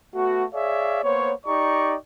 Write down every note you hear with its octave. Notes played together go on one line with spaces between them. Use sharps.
A3 B3 F#4
G#4 C#5 D5 E5 F5
A#3 B3 C5 C#5
D#4 G4 D5 A#5 C#6